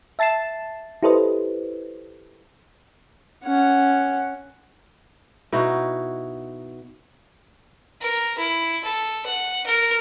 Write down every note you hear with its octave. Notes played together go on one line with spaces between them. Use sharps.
E5 A5 A6 C7 E7
E4 G4 A4 B4 C5 D#5
C#4 F#5
B2 D#4 E4 F#4
A#4
E4
A4
F#5
A#4